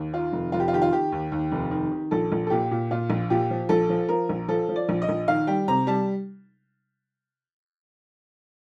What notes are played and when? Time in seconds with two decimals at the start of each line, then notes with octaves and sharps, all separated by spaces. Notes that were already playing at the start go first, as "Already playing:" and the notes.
Already playing: D#2
0.13 D#3 F4
0.33 F1
0.52 F1 F4
0.60 G4
0.68 F4
0.73 D#3 G4
0.82 F4
0.92 D#3 G4
1.12 D#2
1.32 D#2
1.52 F1
1.71 D#3
1.91 D#3
2.11 A#1 A4
2.32 A#1
2.47 A4
2.50 A#2 G4
2.71 A#2
2.91 A#2 F4
3.10 A#1
3.30 A#2 G4
3.50 F3
3.69 A#1 A4
3.89 F3
4.09 F3 A#4
4.29 A#1
4.48 F3 A4
4.69 F3
4.76 D5
4.89 A#1
5.02 D#5
5.09 A#1
5.28 D#3 F5
5.47 G3 G5
5.68 C3 A#5
5.87 G3 A5